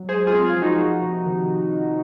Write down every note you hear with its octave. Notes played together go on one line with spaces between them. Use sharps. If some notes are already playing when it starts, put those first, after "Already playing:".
Already playing: F#3
G#3 G#4 C5
F4 G#4
C4
F4 G#4
F3
D#4 F#4
A#3
C3
D#3